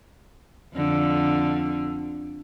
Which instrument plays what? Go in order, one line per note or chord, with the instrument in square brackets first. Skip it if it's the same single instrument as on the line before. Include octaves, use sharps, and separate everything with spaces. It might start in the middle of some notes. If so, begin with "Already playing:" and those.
[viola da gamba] F2 D3